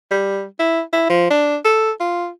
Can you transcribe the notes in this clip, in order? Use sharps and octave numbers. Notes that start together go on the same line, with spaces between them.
G3
E4
E4
F3
D4
A4
F4